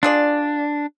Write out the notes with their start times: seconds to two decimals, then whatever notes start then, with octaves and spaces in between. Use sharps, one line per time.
0.03 D4 F4 G#4 D5